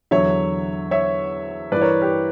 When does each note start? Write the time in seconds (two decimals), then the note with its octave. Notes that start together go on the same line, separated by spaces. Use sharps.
0.11 E2 D3 F#3 C#5 E5
0.91 C#5 E5
1.72 G2 E3 B4 D5
1.82 A#4 C#5
2.02 G4 B4